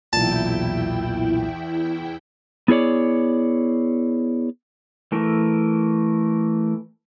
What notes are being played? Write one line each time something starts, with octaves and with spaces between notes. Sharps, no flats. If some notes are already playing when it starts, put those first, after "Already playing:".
B1 E2 A#2 E4 G5 A5
B3 E4 G#4 C#5 D5
E3 A3 A#4